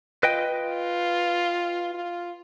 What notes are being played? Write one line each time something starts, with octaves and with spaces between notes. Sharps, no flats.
F4 B4 D#5 G5
F4
F4